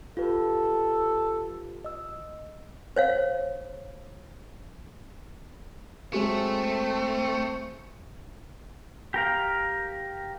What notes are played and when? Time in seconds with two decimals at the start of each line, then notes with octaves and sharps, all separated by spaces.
0.17 F4 G4 A4 B4
1.85 D#5 E6
2.96 C5 C#5 F5
6.13 F#3 G#3 A3 C4
9.14 G4 A#4 F5